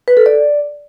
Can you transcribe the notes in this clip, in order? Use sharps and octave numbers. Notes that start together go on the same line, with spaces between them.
B4
A4
D5